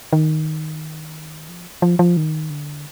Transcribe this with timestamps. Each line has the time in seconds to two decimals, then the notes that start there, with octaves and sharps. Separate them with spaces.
0.13 D#3
1.49 F3
1.82 F3
1.99 F3
2.17 D#3
2.50 D3